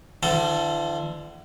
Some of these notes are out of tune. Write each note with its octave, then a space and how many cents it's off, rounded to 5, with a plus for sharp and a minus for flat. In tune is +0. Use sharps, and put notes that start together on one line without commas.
D3 +40 F3 -45 A4 +0